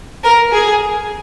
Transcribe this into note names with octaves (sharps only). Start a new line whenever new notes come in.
A#4
G#4